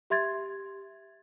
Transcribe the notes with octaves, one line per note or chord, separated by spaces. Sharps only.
G4 E5 C6 G#6 A6